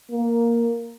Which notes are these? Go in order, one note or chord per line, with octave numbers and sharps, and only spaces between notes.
A#3